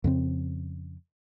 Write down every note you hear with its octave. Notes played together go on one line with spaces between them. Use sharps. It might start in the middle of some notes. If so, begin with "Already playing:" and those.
F2 C#3 C4